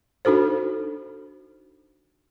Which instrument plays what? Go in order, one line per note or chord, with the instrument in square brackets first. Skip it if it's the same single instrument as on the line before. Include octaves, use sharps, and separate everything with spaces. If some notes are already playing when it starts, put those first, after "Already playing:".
[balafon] D4 D#4 F#4 A4 C5